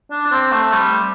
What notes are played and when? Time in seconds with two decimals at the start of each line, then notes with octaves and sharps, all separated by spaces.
0.11 D4
0.26 D4
0.32 C4
0.52 A3
0.73 G3